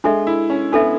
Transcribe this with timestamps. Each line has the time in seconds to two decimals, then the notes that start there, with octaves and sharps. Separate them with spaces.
0.04 G#3 D4 A4 E5
0.27 E4
0.50 C#4
0.73 B3 D4 A4 E5